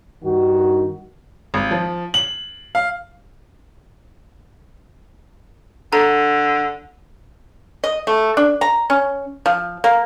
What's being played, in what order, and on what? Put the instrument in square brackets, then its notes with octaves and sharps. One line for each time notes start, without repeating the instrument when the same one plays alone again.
[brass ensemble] G2 D#3 F#4
[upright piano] G#1
F3
F#7
F5
[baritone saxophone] D3 [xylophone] A4 A#5
[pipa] D#5
A3
D4
A#5
C#4
F3
A#3